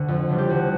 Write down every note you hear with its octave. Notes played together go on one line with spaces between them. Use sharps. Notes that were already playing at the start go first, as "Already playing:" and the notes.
Already playing: D2 D3 F#4
F2
C#3 E3 G3
G4
D2 F#4